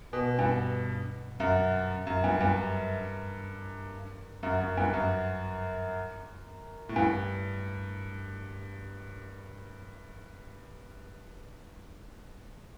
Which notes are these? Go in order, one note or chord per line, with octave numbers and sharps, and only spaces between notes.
B2
G2
F#2
F#2
G2
G2
F#2
F#2
G2
F#2
A2
G2